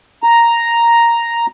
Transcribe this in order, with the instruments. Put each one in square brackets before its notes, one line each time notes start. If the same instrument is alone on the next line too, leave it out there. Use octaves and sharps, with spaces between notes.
[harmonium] A#5